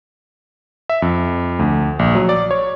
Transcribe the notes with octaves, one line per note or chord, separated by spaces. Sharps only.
E5
F2
D2
A#1
F#3
D5
C#5